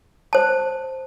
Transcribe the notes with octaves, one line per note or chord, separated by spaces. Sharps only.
C5 A5